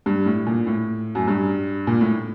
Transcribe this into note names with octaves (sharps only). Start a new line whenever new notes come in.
G2
A2
A#2
A2
F#2
G2
A#2
A2